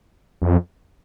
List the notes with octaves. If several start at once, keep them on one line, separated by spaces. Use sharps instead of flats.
F2